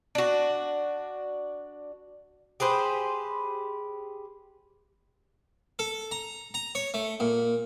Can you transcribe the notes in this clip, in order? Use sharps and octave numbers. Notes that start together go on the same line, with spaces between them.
D4 F#4
G4 G#4 B4 C5
A4
A#5
A#5
C#5
A3
A#2